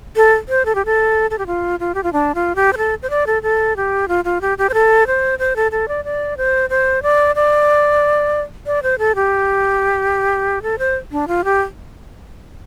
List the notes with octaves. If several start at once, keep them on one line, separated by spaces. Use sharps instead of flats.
A4
C5
A4
G4
A4
A4
G4
F4
F4
G4
F4
D4
F4
G4
C5
A4
C5
D5
A4
A4
G4
F4
F4
G4
G4
C5
A4
C5
C5
A4
A4
D5
D5
C5
C5
D5
D5
D5
C5
A4
G4
A4
C5
D4
F4
G4